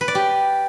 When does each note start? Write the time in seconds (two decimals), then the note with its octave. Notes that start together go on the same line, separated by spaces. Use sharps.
0.01 B4
0.08 D5
0.15 G4